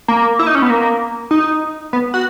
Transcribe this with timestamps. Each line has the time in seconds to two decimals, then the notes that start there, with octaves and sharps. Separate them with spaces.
0.08 A#3
0.39 E4
0.47 D#4
0.55 C#4
0.62 B3
0.70 A#3
1.31 D#4
1.93 B3
2.14 F#4